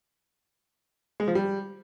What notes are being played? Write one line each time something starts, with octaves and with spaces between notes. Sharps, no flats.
G#3
F3
G3